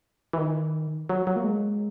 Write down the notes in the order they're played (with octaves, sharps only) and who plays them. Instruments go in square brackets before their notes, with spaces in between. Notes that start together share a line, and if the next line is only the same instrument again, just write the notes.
[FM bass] E3
D#3
F#3
F#3
A#3
G#3